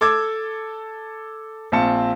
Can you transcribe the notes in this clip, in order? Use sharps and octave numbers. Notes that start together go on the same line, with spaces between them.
A4 D6 E6 G#6
A#1 C4 F4 A5 C#7